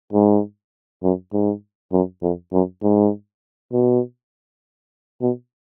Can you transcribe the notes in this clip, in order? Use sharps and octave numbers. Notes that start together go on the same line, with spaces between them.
G#2
F#2
G#2
F#2
F2
F#2
G#2
B2
B2